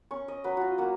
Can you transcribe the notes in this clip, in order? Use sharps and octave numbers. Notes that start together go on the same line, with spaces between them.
C#4 C#6
D#5
F#3 B4
F4 F#4
A#3 F#4